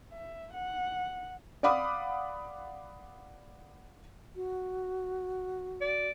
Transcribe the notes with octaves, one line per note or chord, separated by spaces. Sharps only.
E5
F#5
D5 F5 F#5 B5 D6 D#6
F#4
D5